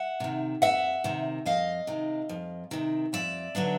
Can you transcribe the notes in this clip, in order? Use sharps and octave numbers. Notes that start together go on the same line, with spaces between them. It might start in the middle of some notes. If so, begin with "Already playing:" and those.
Already playing: E5 F#5
C3 D#3
F2 E5 F#5
C3 D#3
F2 D#5 F5
C3 D#3
F2
C3 D#3
F2 D5 E5
D3 F#3 B3 D4